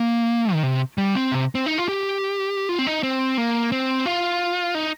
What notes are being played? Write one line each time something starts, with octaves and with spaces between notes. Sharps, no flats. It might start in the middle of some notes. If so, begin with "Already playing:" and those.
Already playing: A#3
D#3
C3
G3
C4
C3
C4
D#4
F4
G4
F4
C4
D#4
C4
A#3
C4
F4
D#4